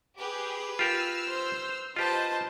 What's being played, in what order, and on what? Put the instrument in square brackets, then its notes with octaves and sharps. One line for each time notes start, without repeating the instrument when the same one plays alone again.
[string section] G4 G#4 [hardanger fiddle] B4
[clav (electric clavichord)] F4 G4 A#4 [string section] E6 F6
[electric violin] C5
[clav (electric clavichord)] F4 G4 [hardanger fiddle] B4 A5 [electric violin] C5 [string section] D#5